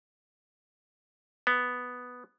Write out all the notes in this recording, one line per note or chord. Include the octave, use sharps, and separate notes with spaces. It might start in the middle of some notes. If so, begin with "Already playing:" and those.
B3